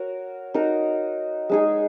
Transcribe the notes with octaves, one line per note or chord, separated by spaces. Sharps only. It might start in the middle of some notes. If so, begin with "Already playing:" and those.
Already playing: F#4 A#4 C#5
D#4 F#4 A#4
G#3 D#4 G#4